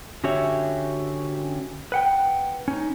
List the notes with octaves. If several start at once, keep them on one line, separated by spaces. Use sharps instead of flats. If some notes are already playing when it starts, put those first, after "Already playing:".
D3 C#4 F#4 G4 C#5 E5
B4 F#5 G5
C#4 D#4